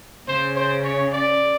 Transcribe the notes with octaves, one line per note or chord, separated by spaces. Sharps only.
C#3 C5
C5
C#5
D5